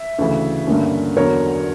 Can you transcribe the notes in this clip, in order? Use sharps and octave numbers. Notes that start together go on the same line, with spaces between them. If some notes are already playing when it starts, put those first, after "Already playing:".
Already playing: E5
D2 C#3 E3
G2 D3 A#3 C#4
E2 D3 F#3 A#4 C#5